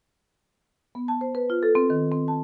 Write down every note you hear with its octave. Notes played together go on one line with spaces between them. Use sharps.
B3
A5
C5
B4
F4
A4
C4
D#3
C4
A5